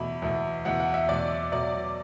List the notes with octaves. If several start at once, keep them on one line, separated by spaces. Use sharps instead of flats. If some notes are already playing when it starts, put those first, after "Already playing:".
Already playing: E2 B2 A3 B5
E2 B2 A3
E2 B2 A3 F#5
F#5
E5
E2 B2 A3 D5
B2 F#3 A3 D5